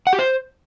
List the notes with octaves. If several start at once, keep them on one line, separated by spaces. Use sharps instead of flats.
F#5
G4
C5